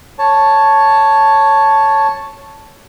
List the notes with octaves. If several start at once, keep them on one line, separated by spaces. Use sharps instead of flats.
C#5 A5